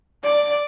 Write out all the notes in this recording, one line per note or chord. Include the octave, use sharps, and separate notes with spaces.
D5